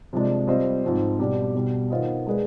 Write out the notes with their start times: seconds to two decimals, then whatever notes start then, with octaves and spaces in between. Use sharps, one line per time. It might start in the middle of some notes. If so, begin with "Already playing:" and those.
0.13 C3 F3 G#3 D4
0.47 G3 C4 F4 C5 D#5
0.84 G#2 F3 C4
1.19 B2 G3 D4 G4
1.55 B2 G3 D4
1.90 D#3 B3 F4 C5 D#5
2.27 G#3 D4 G#4 B4